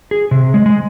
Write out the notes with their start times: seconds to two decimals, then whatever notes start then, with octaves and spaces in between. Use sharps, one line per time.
0.11 G#4
0.31 C3
0.54 G#3
0.66 G#3